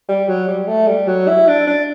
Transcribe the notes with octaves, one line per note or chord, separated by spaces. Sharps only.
G3
F#3
G3
A3
G3
F#3
E4
D4
D4